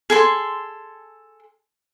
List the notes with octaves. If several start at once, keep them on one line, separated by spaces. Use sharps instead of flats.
G#4 A4 C6